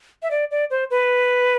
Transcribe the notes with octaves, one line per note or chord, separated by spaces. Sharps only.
E5
D5
D5
C5
B4